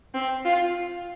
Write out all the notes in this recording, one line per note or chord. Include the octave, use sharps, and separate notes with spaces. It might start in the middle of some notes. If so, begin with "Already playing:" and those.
C4
F4